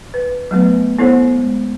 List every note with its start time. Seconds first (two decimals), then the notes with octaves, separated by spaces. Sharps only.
0.14 B4
0.51 F#3 A3 B3 B4
0.99 B3 E4 A4 C5 C#5 F#5
1.37 G#3